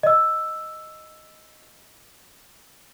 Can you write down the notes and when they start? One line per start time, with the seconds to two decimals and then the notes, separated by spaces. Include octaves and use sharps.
0.03 D#5 E6